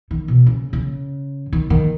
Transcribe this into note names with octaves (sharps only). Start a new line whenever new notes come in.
D#3
B2
C#3
C#3
D#3
D#3